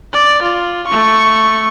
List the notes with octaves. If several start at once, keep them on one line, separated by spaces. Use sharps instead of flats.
D5
F4
A3 C#6